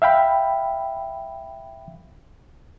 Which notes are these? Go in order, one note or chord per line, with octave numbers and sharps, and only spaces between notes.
E5 F5 G5 B5